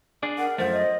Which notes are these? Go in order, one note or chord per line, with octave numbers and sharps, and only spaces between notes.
D4 G#4 D5
A#4 F#5
F#2 F3 A3 C5
D#5